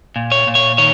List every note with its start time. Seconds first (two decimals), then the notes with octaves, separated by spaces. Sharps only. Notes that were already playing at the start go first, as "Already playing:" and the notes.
0.16 A#2
0.32 C#5
0.47 A#2
0.55 C#5
0.78 D#3 C#5